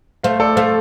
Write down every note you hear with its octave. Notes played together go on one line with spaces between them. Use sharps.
A3 C5 F5
A4 D5
A3 C5 F5